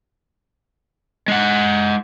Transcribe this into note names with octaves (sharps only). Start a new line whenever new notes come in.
G#3 F#5